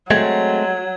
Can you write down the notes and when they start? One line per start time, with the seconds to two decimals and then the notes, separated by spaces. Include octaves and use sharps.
0.11 F#3 G#3 A3 C4 G#6